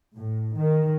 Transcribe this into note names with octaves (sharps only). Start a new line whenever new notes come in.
A2
D#3